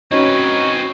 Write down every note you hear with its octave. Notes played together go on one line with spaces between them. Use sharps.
C4 C#4 D#4 F#4 B4 C#5 D#5